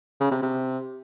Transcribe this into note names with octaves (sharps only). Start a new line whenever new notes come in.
C#3
C3
C3